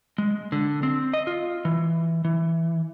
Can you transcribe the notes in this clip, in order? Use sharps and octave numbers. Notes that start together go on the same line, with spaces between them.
G#3
D3
C4
D#5
F4
E3
E3